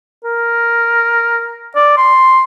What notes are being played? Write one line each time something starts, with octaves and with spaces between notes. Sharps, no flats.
A#4
D5
C6